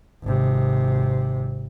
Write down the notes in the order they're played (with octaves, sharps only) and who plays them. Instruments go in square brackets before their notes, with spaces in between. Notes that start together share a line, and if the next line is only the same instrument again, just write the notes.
[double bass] G#1 C3